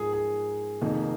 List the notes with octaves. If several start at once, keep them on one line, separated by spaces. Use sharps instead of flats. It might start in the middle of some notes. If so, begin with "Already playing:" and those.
Already playing: G#2 F3 G#4 A#4
G#4
F1 F2 D#3 A#3